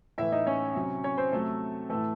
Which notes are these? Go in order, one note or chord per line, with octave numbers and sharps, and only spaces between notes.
A2 E3 E4 E5
D#4 D#5
C#4 C#5
C3 F#3
C#4 C#5
C4 C5
C3 F#3 A3 A4
A2 E3 A3 A4